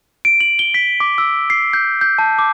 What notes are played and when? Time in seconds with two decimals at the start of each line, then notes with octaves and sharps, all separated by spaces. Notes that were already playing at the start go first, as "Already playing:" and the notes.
0.25 D7
0.40 F#7
0.59 G7
0.74 B6
1.00 D6
1.18 E6
1.50 C7
1.73 G6
2.01 G6
2.18 A5
2.39 D6